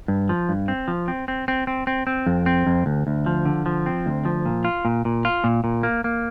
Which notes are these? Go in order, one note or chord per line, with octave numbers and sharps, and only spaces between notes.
G2
F3
G2
C4
F3
C4
C4
C4
C4
C4
C4
F2
C4
F2
D2
D2
F3
D3
F3
C4
D2
F3
A#2
F4
A#2
A#2
F4
A#2
A#2
A#3
A#3